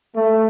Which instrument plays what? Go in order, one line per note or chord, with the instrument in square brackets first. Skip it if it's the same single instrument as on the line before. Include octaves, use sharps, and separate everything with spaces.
[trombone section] A3